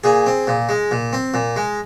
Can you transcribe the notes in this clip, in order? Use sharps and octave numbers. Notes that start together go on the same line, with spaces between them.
A#2 G#4
C4
A#2
G#3
A#2
C4
A#2
G#3